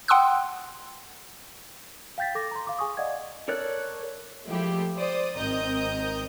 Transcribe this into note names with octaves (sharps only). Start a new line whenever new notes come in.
F#5 G5 C6 D#6 E6 F#6
F5 G5 G6 A6 B6
A4 D6 A#6
A#5 C6
F5 D6
G#4 G#5 C#6 D#6
D5 D#5 F5 F#5 G#6
A4 A#4 C#5 D5 F#6
F3 G#3 A3 E4 G4
C5 D5 D#6
G#1 C4 A#4 D#5 D#6 G6